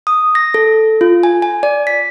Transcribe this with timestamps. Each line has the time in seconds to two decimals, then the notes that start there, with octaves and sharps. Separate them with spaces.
0.07 D#6
0.35 A#6
0.54 A4
1.01 F4
1.23 G#5
1.42 G#5
1.63 D5
1.87 B6